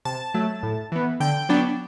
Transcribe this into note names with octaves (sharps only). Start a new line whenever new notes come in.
C3 A5
F#3 A3
A2
E3 B3
D3 G5
F#3 B3 D4